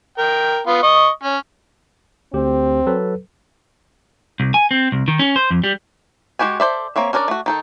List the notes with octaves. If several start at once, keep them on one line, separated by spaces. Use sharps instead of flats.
A#4 G5
B3 F4
D#5 C#6
C#4
D2 C4 G4
F#3 A4 B4
C2
G#5
C4
C2
D#3
C#4
C5
F2
G3
G#3 D#4 F#4 G4 G#5
A4 C5 D5 E5
A#3 C4 C#5 E5
C#4 D4 A#4 C5 D5
A3 F#4
D#3 D#4 A4